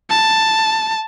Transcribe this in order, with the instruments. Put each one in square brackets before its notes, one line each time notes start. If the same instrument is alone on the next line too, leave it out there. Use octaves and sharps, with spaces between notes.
[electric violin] A5